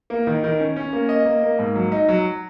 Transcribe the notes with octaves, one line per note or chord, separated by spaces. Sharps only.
A#3
D#3
D#3
C#4
C#4
A#3
D#5
A#3
A#3
G#2
F#3
D#4
F#3